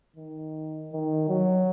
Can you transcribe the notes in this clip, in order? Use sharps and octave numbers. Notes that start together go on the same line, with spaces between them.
D#3
D#3
F#3